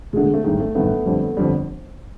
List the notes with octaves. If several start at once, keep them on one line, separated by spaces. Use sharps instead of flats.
E1 D2 D3 G#3
G#3
A3
A1 G2 D#3 G#3
A3
A1 G2 D#3 A3 B3
G1 F2 D3 G3
G1 F2 D3 G3